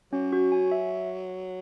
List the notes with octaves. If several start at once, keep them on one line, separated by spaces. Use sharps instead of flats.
F#3 C#4
F#4
G#5
E5